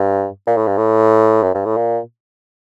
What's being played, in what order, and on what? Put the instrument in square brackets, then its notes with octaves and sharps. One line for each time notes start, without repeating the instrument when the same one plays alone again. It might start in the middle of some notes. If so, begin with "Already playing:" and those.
Already playing: [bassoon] G2
A#2
A2
G2
A2
F#2
G2
A2
A#2